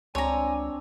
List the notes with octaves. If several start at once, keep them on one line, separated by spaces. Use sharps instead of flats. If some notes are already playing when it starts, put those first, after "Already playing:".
C#2 C4 D4 C#5 G#5 A#5